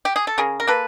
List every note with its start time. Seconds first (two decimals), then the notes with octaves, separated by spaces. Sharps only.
0.05 G4
0.16 G#4
0.27 A4
0.38 C#3 G#4 A#4
0.60 A#4
0.67 A#3 A4 B4